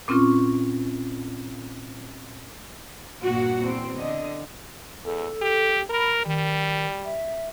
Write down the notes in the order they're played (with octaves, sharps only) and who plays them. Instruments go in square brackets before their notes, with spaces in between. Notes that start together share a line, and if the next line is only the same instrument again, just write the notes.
[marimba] A#2 C4 C#4 F4 C#6
[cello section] G2 A#2 A#3 F#4
E2 C4
D3 D#5
[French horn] E2 [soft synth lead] A4
[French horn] G4
[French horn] A#4 [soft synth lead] B5
[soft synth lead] D#3 [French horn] G3
[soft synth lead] E5